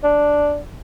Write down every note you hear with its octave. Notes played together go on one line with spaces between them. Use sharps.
D4